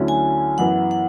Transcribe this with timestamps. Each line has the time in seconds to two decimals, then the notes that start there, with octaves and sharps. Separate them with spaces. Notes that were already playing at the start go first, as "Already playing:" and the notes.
Already playing: D2 D3 F#3 C#4 E4
0.08 G#5
0.58 F#2 E3 B3 E4 F#5
0.91 F#5